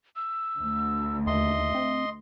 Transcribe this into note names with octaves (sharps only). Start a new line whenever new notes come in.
E6
D2
D#2 D#5 E5 C6
C4